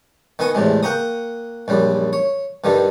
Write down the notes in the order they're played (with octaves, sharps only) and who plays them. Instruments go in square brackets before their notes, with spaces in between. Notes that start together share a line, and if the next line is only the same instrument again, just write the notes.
[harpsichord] D#3 B3 D#5 G#5 C#6
E2 A2 C3 G#3
A#3 F#5 G5 A#5 C#6 D#6
A#1 F#2 G3
C#5
G2 D3 D#3 G3